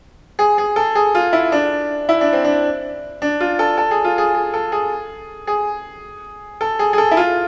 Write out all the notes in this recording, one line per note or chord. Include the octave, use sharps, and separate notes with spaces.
G#4
G#4
A4
G#4
F4
E4
D4
E4
D4
C4
D4
D4
F4
A4
A4
G#4
F4
G#4
G#4
A4
G#4
G#4
A4
G#4
G#4
A4
E4
F4